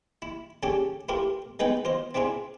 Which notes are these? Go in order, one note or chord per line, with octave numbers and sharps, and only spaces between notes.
E4
C#3 C#4 D4 G4 A4
E4 F4 G4 A4 A#4
G#3 B3 D#4 B4 F#5 G5
F4 C5 D#5
C4 D4 E4 F4 G#4